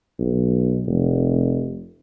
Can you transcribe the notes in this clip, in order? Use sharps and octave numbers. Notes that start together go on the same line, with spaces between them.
B1
F1